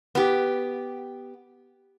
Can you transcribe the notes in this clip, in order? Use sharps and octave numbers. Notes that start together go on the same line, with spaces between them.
B3 G4